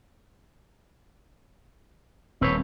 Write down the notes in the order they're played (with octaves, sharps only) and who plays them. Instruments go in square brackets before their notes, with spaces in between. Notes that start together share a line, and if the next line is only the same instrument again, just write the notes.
[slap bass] D#1 [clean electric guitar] C4 B4 C#5